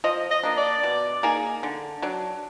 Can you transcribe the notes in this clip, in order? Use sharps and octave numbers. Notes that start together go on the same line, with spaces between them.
F3 D#5
D#5
A#3 D4
D5
B2
A#3 D#4 G#4
D3
F#3 D4